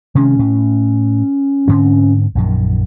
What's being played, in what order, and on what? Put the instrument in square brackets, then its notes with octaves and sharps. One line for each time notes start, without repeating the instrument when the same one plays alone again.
[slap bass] C3 D#3 G#3 [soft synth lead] C#4
[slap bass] A2
G#2 D3 C4
A#1 F#2 D#3